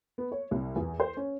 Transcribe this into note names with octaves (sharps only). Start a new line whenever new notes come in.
B3
C#5
C2
E2
C5
C#4